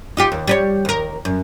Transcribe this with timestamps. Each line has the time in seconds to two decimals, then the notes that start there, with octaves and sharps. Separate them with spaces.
0.17 D#4 F4 G4
0.32 D#2
0.47 G3 B4 C#5
0.85 D#2 A#4
1.25 F#2